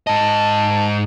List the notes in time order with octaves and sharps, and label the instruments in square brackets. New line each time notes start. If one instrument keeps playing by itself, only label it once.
[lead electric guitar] G#2 D#5 [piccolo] A5